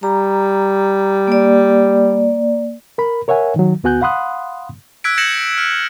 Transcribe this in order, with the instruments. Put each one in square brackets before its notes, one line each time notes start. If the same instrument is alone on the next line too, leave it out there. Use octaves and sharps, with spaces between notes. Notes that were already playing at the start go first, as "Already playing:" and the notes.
[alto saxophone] G3 [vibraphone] A#5
[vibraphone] A#3 D5
[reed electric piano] A#4 B5
A#4 C#5 E5 F#5 G#5
D#3 F#3
D2 B3 F#4 G#5 F#6 G6
F5 F#5 B5 C6 D#6 F#6
[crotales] E6 F#6 G#6 B6 D7
G6 G#6 A#6 C#7 E7 F#7
F6